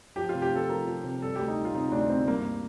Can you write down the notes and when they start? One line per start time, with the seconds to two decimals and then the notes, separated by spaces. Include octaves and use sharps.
0.16 F3 G4
0.29 C3 F4
0.42 G4
0.51 F3 A4
0.69 F3 A#4
0.86 F3
1.04 C3
1.21 G3 A4
1.35 D2 G4
1.48 D#4
1.57 G3
1.65 F4
1.74 C3 D#4
1.92 D2 D4
2.09 D2 C4
2.27 G2 A#3